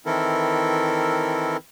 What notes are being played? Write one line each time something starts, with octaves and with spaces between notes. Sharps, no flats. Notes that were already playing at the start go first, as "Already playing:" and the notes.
D#3 E3 C4 E4 A4 A#4